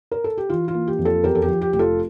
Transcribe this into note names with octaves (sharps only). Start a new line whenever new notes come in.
A#4
A4
G4
E3 F4
F4
A#3
G4
F2
F4 A4
E2 G4 A#4
A4
G4
F3
G4
F1 G4
F4 A4